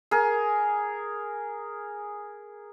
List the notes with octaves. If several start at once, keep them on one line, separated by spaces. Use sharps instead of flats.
G#4 A#4